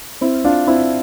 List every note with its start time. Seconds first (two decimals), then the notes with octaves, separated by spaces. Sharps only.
0.21 C4 E4
0.44 D4 F4
0.67 C4 E4